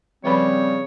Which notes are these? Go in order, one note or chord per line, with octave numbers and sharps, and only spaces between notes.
C#3 F3 G3 C4 B4 C#5 B5